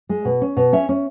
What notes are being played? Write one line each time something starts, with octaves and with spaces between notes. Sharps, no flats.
G#3
B2
C#4
B2
C#4 E5
C#4